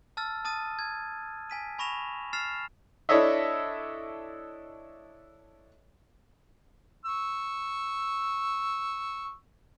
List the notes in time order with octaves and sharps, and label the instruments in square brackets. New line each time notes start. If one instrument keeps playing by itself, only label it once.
[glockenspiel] A5 E6 F6 A6
A5 D#6 A6 D#7
G#6
G#5 B6 D#7
G#5 B5 C#6 A#6 E7 F7
F6 A6 C7 E7 F7
[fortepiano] D4 E4 A4 C#5 D#5 E5
[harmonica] C#6 E6